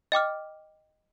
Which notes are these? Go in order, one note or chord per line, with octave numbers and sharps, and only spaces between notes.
D#5 G5 D6 F6